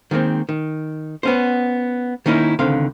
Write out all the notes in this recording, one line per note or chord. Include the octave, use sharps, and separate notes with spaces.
D#3 G#3 A#3 C4
D#3
B3 C#4 C5
D#3 A#3 C#4 D#4 E4
C#2 D3 D#3 C4 F5